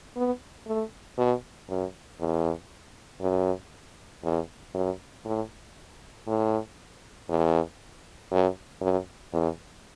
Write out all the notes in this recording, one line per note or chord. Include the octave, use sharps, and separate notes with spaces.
B3
A3
B2
F#2
E2
F#2
E2
F#2
A2
A2
E2
F#2
F#2
E2